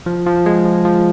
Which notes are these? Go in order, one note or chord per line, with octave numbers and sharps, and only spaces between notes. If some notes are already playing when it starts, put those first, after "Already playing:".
F3
F3
G#3
F3
F3